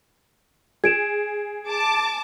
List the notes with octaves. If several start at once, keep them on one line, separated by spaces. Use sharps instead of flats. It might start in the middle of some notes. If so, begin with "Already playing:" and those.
G#4 G#6 D7 E7
A5 D6